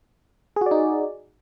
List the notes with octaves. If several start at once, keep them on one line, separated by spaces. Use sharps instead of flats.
D#4 F#4 G#4 D5